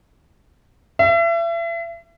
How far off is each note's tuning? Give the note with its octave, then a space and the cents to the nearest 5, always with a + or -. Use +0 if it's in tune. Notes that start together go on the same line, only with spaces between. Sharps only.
E5 +35